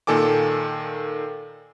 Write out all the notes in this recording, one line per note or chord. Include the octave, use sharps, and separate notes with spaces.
A#2 D#3 A4 G#5 D6